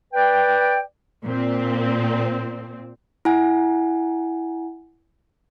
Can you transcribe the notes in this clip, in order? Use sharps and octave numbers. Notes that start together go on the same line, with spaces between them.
B4 D5 G5
A#2 C4
E4 F#5 G#5